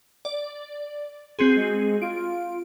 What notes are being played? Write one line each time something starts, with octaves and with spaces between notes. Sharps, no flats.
D5
C4 F#4 G#4 C6
G#3
F4 D7